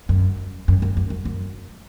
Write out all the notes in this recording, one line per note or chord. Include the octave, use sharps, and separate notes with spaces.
F#2
F#2
F#2
F#2
F#2
F#2